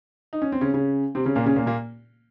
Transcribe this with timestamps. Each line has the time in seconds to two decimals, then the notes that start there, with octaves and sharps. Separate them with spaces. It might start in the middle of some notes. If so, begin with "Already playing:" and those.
0.33 D#4
0.42 C#4
0.52 C4
0.61 C#3 C#4
0.74 C#3 C#4
1.15 C3 C4
1.26 C#3 C#4
1.36 A#2 A#3
1.46 C#3 C#4
1.56 A#2 A#3
1.66 A#2 A#3